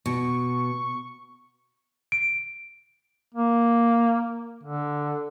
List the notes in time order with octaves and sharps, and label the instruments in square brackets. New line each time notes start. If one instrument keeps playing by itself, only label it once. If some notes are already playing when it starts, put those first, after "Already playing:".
[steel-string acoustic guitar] B2 [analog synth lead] C#6
[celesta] D7
[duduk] A#3
D3